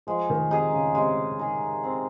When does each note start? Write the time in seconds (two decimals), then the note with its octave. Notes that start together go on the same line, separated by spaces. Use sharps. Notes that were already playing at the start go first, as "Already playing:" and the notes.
0.07 F3 G#3
0.30 D#3
0.51 C3 D#4 G#4
0.74 C#3
0.95 C3 G#3
1.39 D#4 G#4
1.84 C4